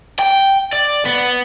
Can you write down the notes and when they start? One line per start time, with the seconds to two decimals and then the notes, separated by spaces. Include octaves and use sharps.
0.19 G5
0.73 D5
1.06 B3